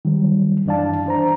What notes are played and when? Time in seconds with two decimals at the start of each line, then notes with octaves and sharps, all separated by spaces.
0.05 D#3 F#3 G3
0.66 F#2 E3 D4 D5 F5 A5
1.06 D4 C5 A#5